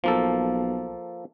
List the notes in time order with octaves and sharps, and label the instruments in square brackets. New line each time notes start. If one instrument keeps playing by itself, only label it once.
[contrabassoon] B1 [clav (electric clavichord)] F3 A#3 A4